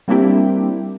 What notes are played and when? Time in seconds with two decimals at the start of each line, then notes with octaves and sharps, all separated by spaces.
0.08 G3 A#3 C4 D4 E4 G4